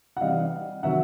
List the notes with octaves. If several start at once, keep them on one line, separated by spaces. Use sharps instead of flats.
F#5
C3 E3 G3 D#5 F5
C3 D#3 F#3 E5 F#5